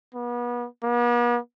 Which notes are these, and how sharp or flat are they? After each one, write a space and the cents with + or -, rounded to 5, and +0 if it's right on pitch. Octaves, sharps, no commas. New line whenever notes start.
B3 -35
B3 -45